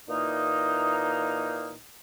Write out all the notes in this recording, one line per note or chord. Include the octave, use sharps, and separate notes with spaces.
A#2 E3 A#3 D#4